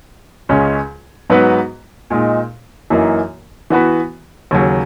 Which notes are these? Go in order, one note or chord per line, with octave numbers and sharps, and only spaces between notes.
C#2 C#3 G#3 C#4
G#2 F#3 B3 F#4 B4
A#2 G#3 D#4
F#2 E3 A#3 D#4
E3 B3 F#4 B4
D#2 C#3 F#3